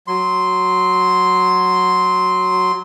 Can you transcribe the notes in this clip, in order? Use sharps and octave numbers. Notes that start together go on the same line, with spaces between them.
F#3 C6